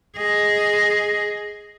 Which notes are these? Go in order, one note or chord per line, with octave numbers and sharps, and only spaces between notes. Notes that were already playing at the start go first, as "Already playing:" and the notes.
G#4 D#5